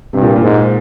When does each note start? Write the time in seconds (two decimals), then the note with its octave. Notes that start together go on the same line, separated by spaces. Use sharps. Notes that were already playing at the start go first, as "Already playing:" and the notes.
0.13 G2 C3
0.22 A#2
0.36 A#2
0.42 G#2